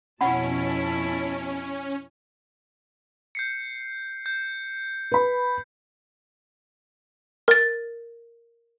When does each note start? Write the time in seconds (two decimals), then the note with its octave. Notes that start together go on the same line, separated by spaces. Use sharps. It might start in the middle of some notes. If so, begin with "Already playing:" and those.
0.21 F2 B2 C#4 E4 F#5 A5 B5
3.35 G6 C7 C#7
4.26 G6
5.12 B4 B5
7.48 A#4 A6